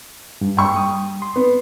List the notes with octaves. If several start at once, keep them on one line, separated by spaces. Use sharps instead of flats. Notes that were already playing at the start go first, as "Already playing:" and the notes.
G2
G5 C#6
G3 D#6
C6
B3